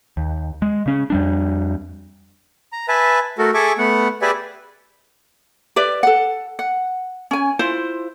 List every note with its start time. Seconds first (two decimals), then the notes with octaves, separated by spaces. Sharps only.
0.17 D#2
0.62 G#3
0.86 C#3 C#4
1.10 F2 G3 D4
2.72 A#5
2.88 B4 E5 G#5 A5
3.38 A3 F#4 A4 A#4
3.54 G#4 A4 E5 G#5 C#6 D6
3.78 A3 B3 F#5
4.22 G4 G#4 B4 D5 E5 G#5
5.76 G4 B4 D5 E5
6.03 A4 F#5
6.59 F#5
7.31 C#4 G#5
7.59 E4 F4 C5